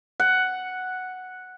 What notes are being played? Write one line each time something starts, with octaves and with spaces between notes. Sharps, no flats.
F#5